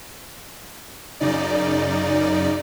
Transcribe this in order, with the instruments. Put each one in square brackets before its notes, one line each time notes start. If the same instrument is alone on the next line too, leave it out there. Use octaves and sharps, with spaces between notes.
[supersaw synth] F#2 C#3 D#4 D5